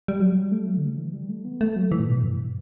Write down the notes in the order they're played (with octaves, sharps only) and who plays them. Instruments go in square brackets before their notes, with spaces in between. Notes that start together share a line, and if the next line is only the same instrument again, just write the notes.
[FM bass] G3
F#3
G3
A3
F#3
D3
C#3
E3
G3
A3
B3
A3
F#3
E3
A2
B2
G2